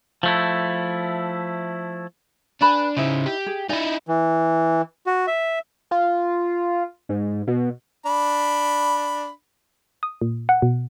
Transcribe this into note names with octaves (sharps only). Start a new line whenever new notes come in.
F3 A3 E4
D4 B4 G#5 B5
C#3 D#4 E4 C5
G4
G#4
D#4 E4 D5 G#5
E3
F#4
E5
F4
G#2
B2
D4 B5
D#6
A#2
F#5
B2